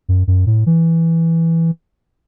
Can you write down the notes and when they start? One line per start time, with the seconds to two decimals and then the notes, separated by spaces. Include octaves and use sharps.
0.09 F#2
0.27 F#2
0.47 A2
0.66 E3